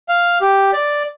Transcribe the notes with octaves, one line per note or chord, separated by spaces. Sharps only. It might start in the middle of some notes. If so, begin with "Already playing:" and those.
F5
G4
D5